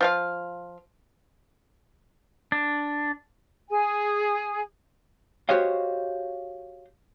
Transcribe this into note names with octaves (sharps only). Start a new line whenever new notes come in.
F3 F4 F5
D4
G#4 G#5
F#4 G4 C5 C#5 D#5 F5